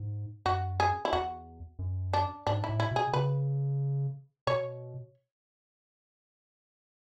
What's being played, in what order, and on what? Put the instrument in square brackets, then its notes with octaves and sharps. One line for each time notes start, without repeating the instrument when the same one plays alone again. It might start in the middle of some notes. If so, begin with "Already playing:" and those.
Already playing: [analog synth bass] G#2
[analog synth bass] F#2 [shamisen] F#4
[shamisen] G#4
E4
[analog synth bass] E2 [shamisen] F#4
[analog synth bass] F#2
[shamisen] D4
[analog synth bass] G#2 [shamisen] D4
[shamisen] E4
[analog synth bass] A2
[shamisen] E4
[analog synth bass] B2 [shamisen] G#4
[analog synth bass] C#3 [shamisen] B4
[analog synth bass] B2 [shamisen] C#5